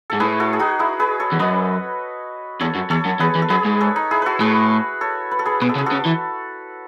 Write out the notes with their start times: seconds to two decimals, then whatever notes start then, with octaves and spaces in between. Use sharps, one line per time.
0.10 G#2 A4
0.20 A2 G#4 B4
0.40 F#4 A4
0.53 G#4
0.59 D#4 F#4
0.79 E4 G#4
0.99 G#4 B4
1.20 A4 C#5
1.32 E2
1.39 F#2 B4 D#5
2.61 E2 A4 C#5
2.75 F#2
2.90 E2 A4 C#5
3.05 F#2
3.20 E2 G#4 B4
3.35 E2
3.42 A4
3.50 F#2 G#4 B4
3.65 G#2
3.80 A4 C#5
3.96 D#4
4.11 E4 G#4
4.22 F#4 A4 B4
4.40 A2 G#4 B4
5.01 A4 C#5
5.31 B4
5.39 A4
5.46 G#4 B4
5.61 B2 B4
5.69 A4
5.76 C#3
5.78 G#4
5.86 F#4 A4
5.92 C#3
6.06 E3